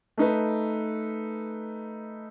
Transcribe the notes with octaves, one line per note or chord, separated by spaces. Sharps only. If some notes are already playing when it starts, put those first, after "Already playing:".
A3 D#4 B4